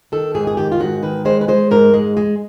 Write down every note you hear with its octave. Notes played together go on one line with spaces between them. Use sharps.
D#3 A4
G#2 G#4
G#4
D#3 G4
F4
G#2 F#4
D#3 B4
G#3 C5
B4
G#3 C5
G#2 A#4
G#3
G#3